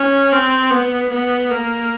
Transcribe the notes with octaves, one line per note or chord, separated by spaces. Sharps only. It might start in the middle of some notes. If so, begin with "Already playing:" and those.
Already playing: C#4
C4
B3
B3
A#3